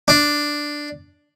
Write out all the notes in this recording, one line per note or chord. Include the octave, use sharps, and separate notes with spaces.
D4